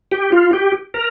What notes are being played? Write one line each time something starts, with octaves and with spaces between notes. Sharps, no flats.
G4
F4
G4
A#4